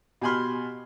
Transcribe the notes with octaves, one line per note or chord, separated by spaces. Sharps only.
B2 G4 G#5 B5 C6 F6